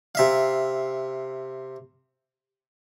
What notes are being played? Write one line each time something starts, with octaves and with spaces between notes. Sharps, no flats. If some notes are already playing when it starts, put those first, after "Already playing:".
C3 E5 F5